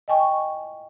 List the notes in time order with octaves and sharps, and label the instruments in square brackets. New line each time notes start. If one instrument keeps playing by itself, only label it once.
[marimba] D#5 G5 G#5 C#6